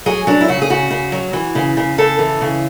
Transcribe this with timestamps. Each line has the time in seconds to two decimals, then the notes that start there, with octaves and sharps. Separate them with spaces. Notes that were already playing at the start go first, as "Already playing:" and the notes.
0.06 F#3 G#4
0.27 F#3 D4
0.41 E4
0.48 C#3 F#4
0.62 G#4
0.70 C#3 F#4
0.90 C#3
1.12 F#3
1.33 E3
1.55 C#3
1.77 C#3
1.98 C#3 A4
2.19 E3
2.41 C#3